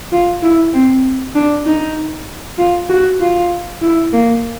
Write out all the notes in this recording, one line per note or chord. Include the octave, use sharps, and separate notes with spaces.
F4
E4
C4
D4
D#4
F4
F#4
F4
E4
A#3